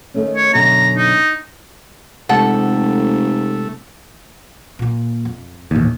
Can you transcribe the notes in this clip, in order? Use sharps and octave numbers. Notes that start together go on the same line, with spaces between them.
D#3 A3 C#4
C#5
F#2 B2 D3 A#5
D#4
F1 C3 G#3 A3 G4 A4 F#5
A#2 A#3
F2
A1 D#2 A#2 A3